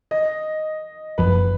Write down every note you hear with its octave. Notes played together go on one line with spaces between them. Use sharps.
D#5
F#1 F#2 F3 B4